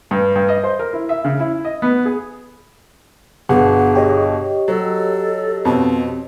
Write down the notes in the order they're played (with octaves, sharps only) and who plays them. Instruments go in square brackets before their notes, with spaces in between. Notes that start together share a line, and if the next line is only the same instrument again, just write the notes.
[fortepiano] G2
G2
D#5
C5
A#4
E4
E5
C#3
E4
D#5
B3
G#4
[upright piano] G1 B2 [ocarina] G#4 [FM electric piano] F#5
[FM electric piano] G4 C#5 D#5
[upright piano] F#3 [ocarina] A4
[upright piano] F2 B2 [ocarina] C4